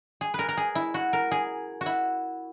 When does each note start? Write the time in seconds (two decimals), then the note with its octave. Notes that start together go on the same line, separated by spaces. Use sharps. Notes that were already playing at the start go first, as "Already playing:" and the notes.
0.21 G#4
0.34 A#4 B4
0.49 A#4
0.57 G#4
0.75 E4
0.94 F#4
1.13 A#4
1.31 G#4
1.81 F#4
1.86 E4